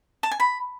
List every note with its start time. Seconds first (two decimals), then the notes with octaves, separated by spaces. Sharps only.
0.23 A5
0.31 G#5
0.40 B5